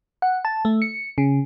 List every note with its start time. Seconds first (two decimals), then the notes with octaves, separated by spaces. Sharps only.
0.22 F#5
0.45 A5
0.65 A3
0.82 C#7
1.18 C#3